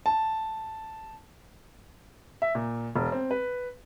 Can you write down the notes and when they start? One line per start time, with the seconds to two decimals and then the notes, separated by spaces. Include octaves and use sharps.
0.06 A5
2.42 E5
2.55 A#2
2.96 E1
3.12 C4
3.31 B4